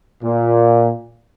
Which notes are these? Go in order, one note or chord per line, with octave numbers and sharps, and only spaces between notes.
A#2